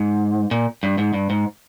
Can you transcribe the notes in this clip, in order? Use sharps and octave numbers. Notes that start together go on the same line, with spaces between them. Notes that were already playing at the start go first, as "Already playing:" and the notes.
Already playing: G#2
A#2
G2
G#2
G2
G#2